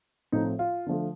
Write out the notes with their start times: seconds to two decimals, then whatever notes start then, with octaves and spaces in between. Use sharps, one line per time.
0.32 A2 F3 A3 C4 D#4
0.59 F4
0.86 D3 F3 A3